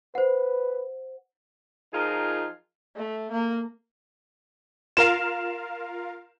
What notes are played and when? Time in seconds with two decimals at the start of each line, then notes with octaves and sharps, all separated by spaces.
0.15 B4 C5 F#5
1.94 F3 D#4 F4 G#4 A#4
2.96 A3
3.31 A#3
4.97 F4 A#4 F5 E7